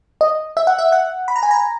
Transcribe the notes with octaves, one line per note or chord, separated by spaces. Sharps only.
D#5
E5
F#5
E5
F#5
B5
A#5
G#5
A#5